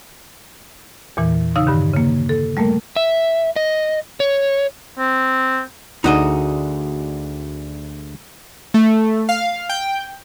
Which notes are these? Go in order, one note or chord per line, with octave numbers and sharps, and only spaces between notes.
E2 A#2 E3
C#3 D#4 F5 D#6 E6
G2 D3 D#3
C#3 A#3
A4
G3 A3 A#3 A#4
E5
D#5
C#5
C4
D2 D3 D#4 F#4 G#4 D#5
A3
F5
G5